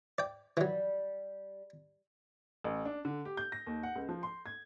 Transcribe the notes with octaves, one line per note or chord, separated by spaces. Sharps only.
D5 G5
E3 F#3 G3
A1
D4
D3
G4
G6
A#6
D#2
F#5
C#2
F3
C6
G#6